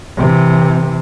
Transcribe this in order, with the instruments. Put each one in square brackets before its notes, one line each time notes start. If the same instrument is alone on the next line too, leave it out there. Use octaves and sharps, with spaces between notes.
[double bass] C3 E3